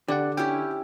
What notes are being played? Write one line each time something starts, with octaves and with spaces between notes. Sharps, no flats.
D3 G4 D5 F#5
C#4 E4 G4 G5